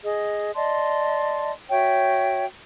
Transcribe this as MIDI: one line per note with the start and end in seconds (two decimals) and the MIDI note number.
0.04 0.52 68
0.04 0.52 75
0.55 1.51 74
0.55 1.51 75
0.55 1.51 81
0.55 1.51 84
1.70 2.45 66
1.70 2.45 73
1.70 2.45 76
1.70 2.45 79